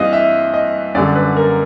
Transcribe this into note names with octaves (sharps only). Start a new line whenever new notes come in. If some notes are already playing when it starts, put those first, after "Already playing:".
Already playing: G2 E3 G3 C4 D#5 F5
E5
D#5
F#2 D3 G3 D5
B4
A#4